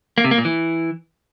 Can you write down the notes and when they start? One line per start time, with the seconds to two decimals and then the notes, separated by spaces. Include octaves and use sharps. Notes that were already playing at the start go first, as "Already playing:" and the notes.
0.18 A#3
0.24 C3
0.31 A#3
0.38 A#2
0.45 E3